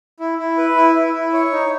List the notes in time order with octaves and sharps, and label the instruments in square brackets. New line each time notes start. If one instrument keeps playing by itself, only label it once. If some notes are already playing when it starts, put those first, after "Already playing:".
[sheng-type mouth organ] E4
E4
B4
E4
E4
E4
C#5
D#4